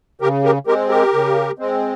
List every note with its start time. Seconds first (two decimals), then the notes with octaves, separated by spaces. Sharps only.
0.21 C#3 G4 A#4
0.44 G4 A#4
0.67 G#3 C4 G4 A#4
0.89 G4 A#4
1.13 C#3
1.59 G#3 C4